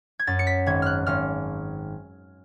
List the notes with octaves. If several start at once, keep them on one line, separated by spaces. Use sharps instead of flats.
G#6
F#2 A6
C#7
B6
G#1 G#6
F6 F#6
G#1 F6